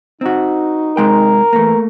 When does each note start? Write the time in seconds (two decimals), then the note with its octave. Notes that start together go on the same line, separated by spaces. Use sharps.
0.21 C4 D#4 F#4
0.97 C3 G#3 A#4 G5
1.53 E3 A3 A#3